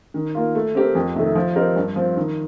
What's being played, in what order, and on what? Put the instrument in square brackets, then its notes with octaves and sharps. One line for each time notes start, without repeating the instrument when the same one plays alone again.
[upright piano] D#3
A#3 F4
A3
C4 G4 A#4
F2
C3 D#3 A3
F3
C4 G4 A#4 D#5
G2
F3 C4
D#3